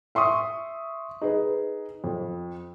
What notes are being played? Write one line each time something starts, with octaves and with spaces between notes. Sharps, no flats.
E5 C6 C#6 D#6
D#4 G#4 B4
F2